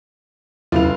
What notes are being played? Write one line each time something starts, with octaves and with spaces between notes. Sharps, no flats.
F1 D#2 C#3 F#3 E4 F4 F7